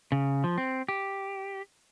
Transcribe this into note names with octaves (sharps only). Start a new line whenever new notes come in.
C#3
F3
C4
G4